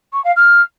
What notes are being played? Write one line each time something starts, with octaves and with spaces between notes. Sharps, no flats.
C#6
F5
F6